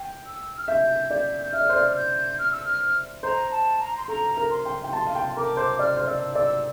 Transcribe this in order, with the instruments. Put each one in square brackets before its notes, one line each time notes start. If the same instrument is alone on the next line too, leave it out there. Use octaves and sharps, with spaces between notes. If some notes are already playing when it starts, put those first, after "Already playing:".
Already playing: [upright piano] G5
[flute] E6
F6
[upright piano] E5 [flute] G6
[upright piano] D5
[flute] G6
[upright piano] E5 [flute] F6
[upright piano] D5
C5
D5
[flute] F6
G6
F6
E6
F6
[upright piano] C5 [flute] A#5
[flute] A5
A#5
C6
[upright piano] A4 [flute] A#5
[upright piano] A#4
[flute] C6
[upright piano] G5
G5
[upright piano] A5 [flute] C6
[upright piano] F5
G5
[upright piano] A#4 [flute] D6
[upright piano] C5
[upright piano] D5 [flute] F6
[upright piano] C5
[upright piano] D5 [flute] E6
[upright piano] D5 [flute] E6